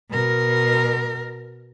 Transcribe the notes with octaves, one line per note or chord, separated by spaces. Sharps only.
B2 A#4